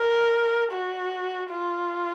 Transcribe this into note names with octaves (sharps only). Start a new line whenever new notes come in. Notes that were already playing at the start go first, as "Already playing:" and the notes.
Already playing: A#4
F#4
F4